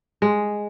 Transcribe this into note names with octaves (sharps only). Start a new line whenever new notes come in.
G#3